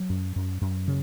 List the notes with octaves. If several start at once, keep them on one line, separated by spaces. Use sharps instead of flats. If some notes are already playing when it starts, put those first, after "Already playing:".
Already playing: F#3
F#2
F#2
F#2
C#3